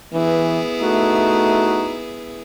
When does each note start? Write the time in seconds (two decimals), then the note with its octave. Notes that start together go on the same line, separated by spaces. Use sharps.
0.14 E3 B3 E4 G#4
0.82 A3 D#4 F#4